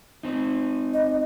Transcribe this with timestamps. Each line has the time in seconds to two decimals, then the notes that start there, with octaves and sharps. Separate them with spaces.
0.23 C4 D#4
0.94 D#5